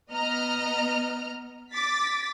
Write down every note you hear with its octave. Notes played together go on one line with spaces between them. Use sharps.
B3 D#5 A#5 F6
D6 A6 B6